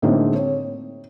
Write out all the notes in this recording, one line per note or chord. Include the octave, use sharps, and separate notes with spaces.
A2 D3 G#3 A#3 C4 D#4
C#5